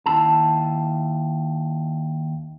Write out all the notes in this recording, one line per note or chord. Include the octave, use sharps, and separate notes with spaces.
D#2 E4 A5